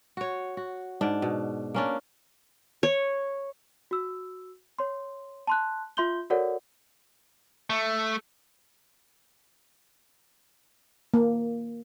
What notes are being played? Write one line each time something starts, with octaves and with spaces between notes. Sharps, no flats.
F#4 C#5
F#4
G#2 D4
B2
A#3 C#4 D4
C#5
F#4 E6
C#5 C6
A5 C6 F#6
F4 E5 C6 G6 G7
F#4 A4 A#4 C#5 D5 F#5
A3
A#3